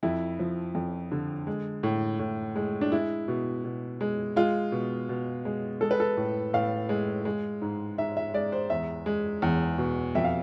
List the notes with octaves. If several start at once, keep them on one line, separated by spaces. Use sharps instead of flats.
F2 E4
F3
F2
D3
G#3
A2
A2
G#3
D4
G#3 E4
B2
B2
G#3
G#3 F4
B2
B2
G#3
G#3 A4
B4
A4
A2
A2 F5
G#3
G#3
G#2
G#2 E5
E5
G#3 D5
C5
E2 E5
G#3
E2
B2
F2 E5
F5